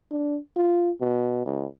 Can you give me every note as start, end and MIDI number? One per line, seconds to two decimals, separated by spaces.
0.11 0.39 62
0.56 0.91 65
1.01 1.41 47
1.45 1.66 37